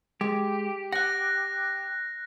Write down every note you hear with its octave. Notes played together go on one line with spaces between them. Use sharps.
G#3 G4
F#5 F#6 A#6